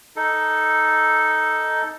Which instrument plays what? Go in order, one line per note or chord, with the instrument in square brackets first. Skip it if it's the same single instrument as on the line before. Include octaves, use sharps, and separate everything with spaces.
[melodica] D#4 A4